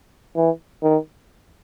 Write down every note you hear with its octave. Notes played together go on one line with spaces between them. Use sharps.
E3
D#3